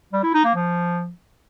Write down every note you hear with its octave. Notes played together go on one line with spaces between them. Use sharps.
G3
E4
D#4
A#3
F3